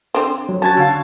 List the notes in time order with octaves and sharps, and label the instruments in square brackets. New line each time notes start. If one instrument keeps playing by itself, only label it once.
[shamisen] D3 C4
[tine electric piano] F#3
[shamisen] C#4 [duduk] F#4 [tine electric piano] A5 G#6 A6
[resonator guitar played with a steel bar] D3 F5 [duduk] F#4